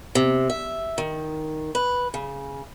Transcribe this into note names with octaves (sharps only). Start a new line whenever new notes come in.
C3
E5
D#3
B4
C#3